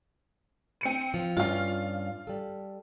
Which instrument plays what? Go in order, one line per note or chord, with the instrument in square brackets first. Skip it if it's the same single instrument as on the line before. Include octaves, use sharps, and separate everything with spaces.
[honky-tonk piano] C4 C#7 D#7
[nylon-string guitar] F3
[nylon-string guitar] G2 C#4 [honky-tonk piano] F4 F5
[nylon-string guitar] G3 A4